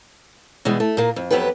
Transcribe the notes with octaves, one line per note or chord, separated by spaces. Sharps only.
B2 E3 G3 G#3
A3
A#2 A#3
F2
F2 C3 F#3 B3 G4 B4